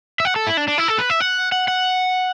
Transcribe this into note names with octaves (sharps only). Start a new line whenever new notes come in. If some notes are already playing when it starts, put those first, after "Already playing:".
E5
F#5
A4
E4
D4
D4
E4
A4
B4
E5
F#5
F#5
F#5